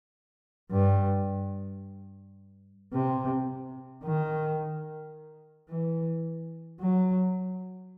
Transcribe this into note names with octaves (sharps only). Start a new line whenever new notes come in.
G2
C3
D#3
E3
F#3